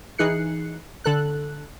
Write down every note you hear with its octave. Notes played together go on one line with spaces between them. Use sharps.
E3 D#4 G#4 F#6 C7 C#7
D3 A4 F#6